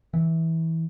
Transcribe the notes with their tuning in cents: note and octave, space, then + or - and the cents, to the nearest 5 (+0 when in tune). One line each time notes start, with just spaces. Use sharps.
E3 -20